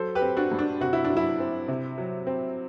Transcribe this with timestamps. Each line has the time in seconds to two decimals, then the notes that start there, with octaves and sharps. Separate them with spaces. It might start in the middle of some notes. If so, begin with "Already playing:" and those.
Already playing: F#3 A4 C5
0.15 G4 B4
0.22 C4
0.37 D4 F#4
0.52 G2
0.59 D4
0.81 C3 F#4
0.93 E4
1.04 D4
1.10 F#3
1.17 E4
1.40 C4
1.68 C3
1.98 F#3
2.27 C4